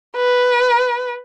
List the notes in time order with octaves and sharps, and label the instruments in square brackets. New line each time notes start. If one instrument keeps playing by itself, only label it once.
[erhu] B4